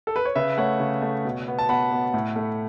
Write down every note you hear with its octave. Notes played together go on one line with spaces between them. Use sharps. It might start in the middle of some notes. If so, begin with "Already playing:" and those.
A4
B4
C#5
C#3 B4 E5
A3 C#5 F#5
C#3
A3
B2
B3
A5
B2 F#5 B5
B3
A2
A3